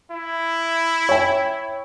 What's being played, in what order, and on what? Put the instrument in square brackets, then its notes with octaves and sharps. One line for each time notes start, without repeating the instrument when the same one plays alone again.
[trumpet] E4
[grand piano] C#5 G5